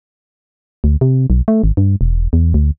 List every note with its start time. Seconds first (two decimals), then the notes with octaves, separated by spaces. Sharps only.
0.84 D2
1.01 C3
1.30 B1
1.48 A3
1.64 G#1
1.77 G2
2.01 E1
2.33 E2
2.54 D2